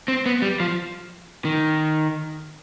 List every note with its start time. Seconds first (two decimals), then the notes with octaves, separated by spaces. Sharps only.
0.08 C4
0.26 B3
0.42 G3
0.60 F3
1.45 D#3